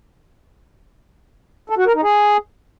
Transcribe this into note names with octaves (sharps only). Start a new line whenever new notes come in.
A4
F#4
A#4
D#4
G#4